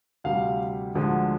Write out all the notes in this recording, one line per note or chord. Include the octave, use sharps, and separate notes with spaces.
D2 C3 G3 F5
D2 D3 F3 G#3